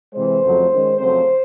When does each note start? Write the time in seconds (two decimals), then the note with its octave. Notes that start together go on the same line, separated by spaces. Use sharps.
0.14 C3 E3 G#3 C5
0.42 F2 C#3 F#3 A3
0.70 D#3 G#3 C#4
0.98 F2 C#3 F#3 A3 C4 C5